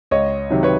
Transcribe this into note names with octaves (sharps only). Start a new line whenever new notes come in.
C#2 C#5 D#5
C3 D#3 F#3
B4 C#5